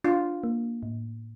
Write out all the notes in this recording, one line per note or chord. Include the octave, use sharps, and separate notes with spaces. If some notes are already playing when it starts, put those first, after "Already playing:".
D4 F4
A#3
A2